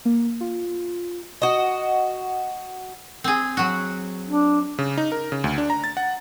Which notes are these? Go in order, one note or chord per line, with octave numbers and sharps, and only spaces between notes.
A#3
F4
F#4 D#5
C4 G#4
F#3 F#4
D4
C#3
D#4
A#4
C#3
D2
D4
A#5
A6
F#5